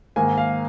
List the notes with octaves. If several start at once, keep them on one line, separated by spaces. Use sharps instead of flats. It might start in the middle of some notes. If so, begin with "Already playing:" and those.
G#2 D#3 A#3 G#5
F5